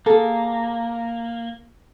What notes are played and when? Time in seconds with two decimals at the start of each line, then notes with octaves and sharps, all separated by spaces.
0.06 A#3 G#4 A4